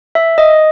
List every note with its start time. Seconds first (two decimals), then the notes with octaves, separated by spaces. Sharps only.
0.15 E5
0.38 D#5